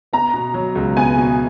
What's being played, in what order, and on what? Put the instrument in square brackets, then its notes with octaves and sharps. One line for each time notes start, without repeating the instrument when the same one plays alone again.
[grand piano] B3 [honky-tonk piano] A#5
[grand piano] B2
F#3
C#2
[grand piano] B3 [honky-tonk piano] G#5
[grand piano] B2